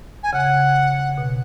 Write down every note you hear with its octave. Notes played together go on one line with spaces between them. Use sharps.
G#5
C#3 F#5
B2